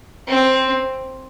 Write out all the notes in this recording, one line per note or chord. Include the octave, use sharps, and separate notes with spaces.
C4